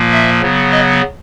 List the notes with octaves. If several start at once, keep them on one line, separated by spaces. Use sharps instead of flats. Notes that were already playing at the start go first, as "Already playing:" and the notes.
Already playing: A#2 F3 A#3
E5
C#3 F#3 B3
D#5